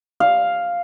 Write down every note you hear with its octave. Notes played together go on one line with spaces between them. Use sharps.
F5